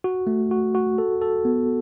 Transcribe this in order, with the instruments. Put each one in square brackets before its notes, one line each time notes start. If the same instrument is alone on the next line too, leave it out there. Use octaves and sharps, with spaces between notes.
[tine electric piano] F#4
A3
F#4
F#4
A4
A4
B3